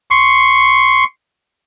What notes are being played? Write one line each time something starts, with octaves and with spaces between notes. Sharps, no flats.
C6 C#6